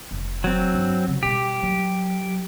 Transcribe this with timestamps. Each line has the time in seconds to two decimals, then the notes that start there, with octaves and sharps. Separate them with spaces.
0.11 F1
0.44 F#3 C4
0.73 G2 D#4
1.08 C#3
1.23 B2 G3 G4
1.62 F#3